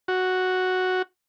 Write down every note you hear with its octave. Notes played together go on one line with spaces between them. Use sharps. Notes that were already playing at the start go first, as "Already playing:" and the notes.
F#4